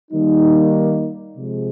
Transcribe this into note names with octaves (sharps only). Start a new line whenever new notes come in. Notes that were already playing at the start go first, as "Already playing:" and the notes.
D#3 G3 A#3 D#4
C3 F3 G#3